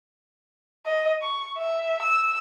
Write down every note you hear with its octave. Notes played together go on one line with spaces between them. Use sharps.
D#5
C#6
E5
E6